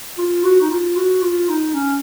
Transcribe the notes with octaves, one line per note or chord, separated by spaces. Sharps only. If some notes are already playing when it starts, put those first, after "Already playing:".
F4
F#4
D#4
F4
F#4
F4
D#4
C#4